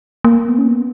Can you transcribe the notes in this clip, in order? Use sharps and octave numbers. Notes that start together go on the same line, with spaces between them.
A#3
B3
C#4
B3